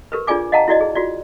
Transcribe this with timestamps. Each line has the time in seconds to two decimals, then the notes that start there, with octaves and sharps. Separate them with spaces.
0.12 G4 A#4 B4
0.27 D4 F4 G#4 D5 G#5 D6
0.52 D#5 F5 F#5 A5 A#5
0.68 E4 F#4 D5 D#5
0.81 G#4
0.95 F4 F#4 D5